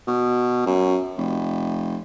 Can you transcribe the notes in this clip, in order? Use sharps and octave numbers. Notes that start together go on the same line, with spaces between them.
B2
F#2
F1